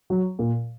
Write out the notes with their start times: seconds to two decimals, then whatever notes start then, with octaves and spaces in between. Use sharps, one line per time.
0.10 F#3
0.39 A#2